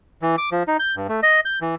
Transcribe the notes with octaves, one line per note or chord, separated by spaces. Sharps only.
E3
D6
F3
D#4
G6
G2
A3
D#5
G6
E3